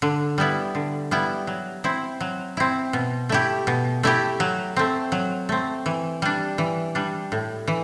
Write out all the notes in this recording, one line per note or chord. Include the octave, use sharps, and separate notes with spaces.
D3
G3 B3 E4
D3
G3 B3 E4
F#3
C4 E4
F#3
C4 E4
B2
A3 E4 G4
B2
A3 E4 G4
F#3
A3 C4
F#3
A3 C4
E3
G3 D4
E3
G3 D4
A2
E3